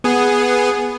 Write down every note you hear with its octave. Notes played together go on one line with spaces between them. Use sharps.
B3 G#4